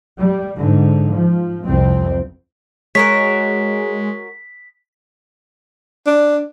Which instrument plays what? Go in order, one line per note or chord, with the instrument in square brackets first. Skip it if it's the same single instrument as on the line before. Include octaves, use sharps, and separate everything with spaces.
[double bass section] G3
G#2 D3
F3
C2 F2 C4
[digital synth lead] G#3 [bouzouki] F#4 A#4 C#5 [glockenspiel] B6
[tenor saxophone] D4